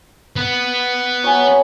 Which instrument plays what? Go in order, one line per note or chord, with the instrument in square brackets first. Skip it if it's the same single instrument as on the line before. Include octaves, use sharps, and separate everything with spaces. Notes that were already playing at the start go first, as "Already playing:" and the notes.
[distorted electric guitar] B3
[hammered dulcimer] F#3 C#5 G#5